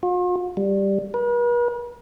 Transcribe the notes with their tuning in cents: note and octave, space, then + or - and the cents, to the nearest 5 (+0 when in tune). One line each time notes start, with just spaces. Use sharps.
F4 +45
G3 +5
B4 -45